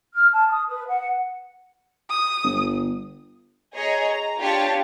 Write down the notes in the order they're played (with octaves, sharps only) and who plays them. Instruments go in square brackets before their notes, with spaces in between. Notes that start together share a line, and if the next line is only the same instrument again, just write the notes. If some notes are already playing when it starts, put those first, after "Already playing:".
[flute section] F6
A5
D#6
B4
F#5
[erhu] D#6
[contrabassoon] G1
[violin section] G#4 C#5 D#5 G#5 A#5
A#5
D4 F4 G4 C#5 A5